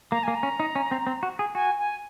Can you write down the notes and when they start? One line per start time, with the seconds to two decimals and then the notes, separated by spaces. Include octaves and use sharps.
0.12 A#3 A#5
0.23 A#3 G#5
0.35 A#5
0.43 C#4
0.60 D#4
0.76 C#4
0.91 C4
1.07 C4
1.23 F#4
1.39 G#4
1.55 F#4 G#5
1.78 G#5